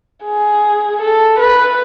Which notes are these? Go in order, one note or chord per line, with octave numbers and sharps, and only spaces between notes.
G#4
A4
B4